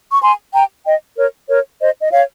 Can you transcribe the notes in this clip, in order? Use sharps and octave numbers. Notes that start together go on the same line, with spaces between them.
C#6
G#5 C6
G5 A#5
D#5 G5
A#4 C#5
A#4 C#5
C5 D#5
D#5
C#5 F5